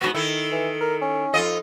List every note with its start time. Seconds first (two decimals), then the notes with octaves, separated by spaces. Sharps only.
0.01 G#2 C3 B3 F#4
0.14 D#3 E4 A4
0.52 E3
0.81 A#4
1.01 C#4
1.34 F2 F4 A4 D#5